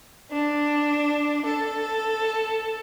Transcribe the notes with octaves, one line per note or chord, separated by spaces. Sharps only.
D4
A4